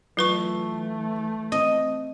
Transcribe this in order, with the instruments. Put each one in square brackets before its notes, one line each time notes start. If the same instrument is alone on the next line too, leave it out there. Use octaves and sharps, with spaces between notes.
[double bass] E3 A3 [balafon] F#3 B4 C#6 [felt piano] F4
[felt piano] C4 [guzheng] D#5